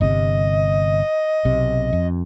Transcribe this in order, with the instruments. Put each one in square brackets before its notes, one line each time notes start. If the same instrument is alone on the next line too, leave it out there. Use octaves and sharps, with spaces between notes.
[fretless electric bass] G1 C3 [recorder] D#5
[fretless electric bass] B1 C3
F2